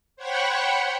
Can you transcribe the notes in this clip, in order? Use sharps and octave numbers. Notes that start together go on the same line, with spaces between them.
C5 C#5 F#5 G5 B5 C#6